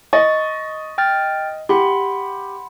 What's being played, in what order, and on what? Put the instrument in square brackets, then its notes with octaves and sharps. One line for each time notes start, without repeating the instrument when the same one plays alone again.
[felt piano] D#5 [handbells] C#6 A6
[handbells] G5 F6 A6
[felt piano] G4 [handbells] F#5 B5 C6